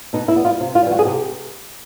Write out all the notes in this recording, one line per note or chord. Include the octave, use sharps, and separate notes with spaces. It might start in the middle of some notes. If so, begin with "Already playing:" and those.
B2 D#4
E4
G3 B3
F4
C3
F4
E3 G3
F#4
G#4
C3 G4